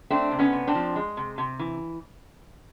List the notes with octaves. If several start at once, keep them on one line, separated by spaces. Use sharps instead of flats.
A3 C4 D4
C3
B3 C#4
C3
C4 D4
F3
G#3
C3
C3
E3